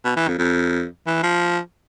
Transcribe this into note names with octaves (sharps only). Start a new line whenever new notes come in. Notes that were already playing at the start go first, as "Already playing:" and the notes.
B2
E3
F2
F2
E3
F3